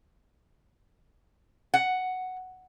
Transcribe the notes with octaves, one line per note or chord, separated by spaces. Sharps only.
F#5